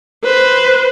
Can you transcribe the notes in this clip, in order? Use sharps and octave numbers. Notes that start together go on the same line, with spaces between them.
B4 C5